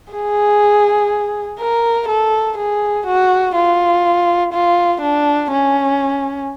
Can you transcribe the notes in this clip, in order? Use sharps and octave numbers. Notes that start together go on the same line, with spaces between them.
G#4
A#4
A4
G#4
F#4
F4
F4
D4
C#4